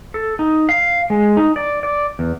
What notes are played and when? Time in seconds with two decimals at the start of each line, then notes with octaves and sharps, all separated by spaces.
0.14 A4
0.39 D#4
0.69 F5
1.10 G#3
1.37 D#4
1.56 D5
1.83 D5
2.19 E2